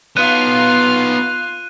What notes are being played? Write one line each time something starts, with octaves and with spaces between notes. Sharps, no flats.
B3 D#4 F4 F5 F#6 D#7